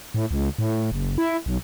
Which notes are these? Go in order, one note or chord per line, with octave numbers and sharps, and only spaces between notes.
A2
C#2
A2
F#1
E4
B1